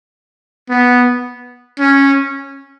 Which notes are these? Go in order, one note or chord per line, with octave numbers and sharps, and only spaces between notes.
B3
C#4